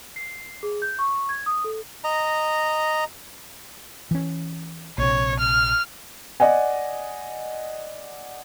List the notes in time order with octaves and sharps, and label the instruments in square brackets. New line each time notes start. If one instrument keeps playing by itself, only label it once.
[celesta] C7
G#4
G6
C#6
G#6
D#6
A4
[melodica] D#5 A#5
[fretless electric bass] E3 C#4
[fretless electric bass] A#1 C3 [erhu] C#5
[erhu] F6
[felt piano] D5 D#5 F#5 G#5